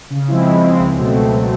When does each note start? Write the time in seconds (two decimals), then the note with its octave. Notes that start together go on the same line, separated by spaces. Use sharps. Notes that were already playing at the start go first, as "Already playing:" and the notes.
0.10 C#3
0.28 F3 G#3 C4 E4
0.45 C#3
0.62 F3 G#3 C4 E4
0.79 C#2
0.98 B2 F#3 A3 C4
1.15 C#2
1.32 B2 F#3 A3 C4